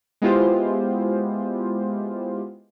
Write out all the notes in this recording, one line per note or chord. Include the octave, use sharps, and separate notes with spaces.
G#3 B3 E4 F4 G4 C5